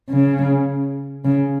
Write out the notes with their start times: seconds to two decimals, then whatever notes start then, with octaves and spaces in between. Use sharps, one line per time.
0.10 C#3
1.25 C#3